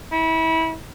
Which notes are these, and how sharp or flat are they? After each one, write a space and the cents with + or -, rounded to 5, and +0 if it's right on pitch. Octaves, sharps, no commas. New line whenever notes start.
E4 -30